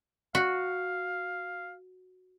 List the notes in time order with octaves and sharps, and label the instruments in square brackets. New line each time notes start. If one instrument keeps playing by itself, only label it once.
[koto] F#4 [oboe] F5